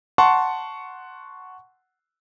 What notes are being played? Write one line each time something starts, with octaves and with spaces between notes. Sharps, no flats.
F#5 A5 C6 C#6